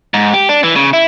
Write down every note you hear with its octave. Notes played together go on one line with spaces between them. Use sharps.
G#2
G4
D4
E3
C#3
E4